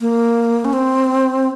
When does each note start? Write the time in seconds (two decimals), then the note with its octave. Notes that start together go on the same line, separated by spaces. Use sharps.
0.01 A#3
0.65 C#4
0.73 C4